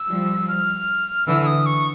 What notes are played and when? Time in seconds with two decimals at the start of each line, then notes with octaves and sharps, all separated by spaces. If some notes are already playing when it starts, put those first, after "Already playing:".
Already playing: E6
0.08 F3 G3
0.48 F6
1.27 D3 E3 E6
1.42 E6
1.46 D#6
1.66 C#6